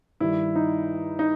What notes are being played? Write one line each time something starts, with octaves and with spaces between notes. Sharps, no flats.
G2 D#3 G3 E4
D#4
D#4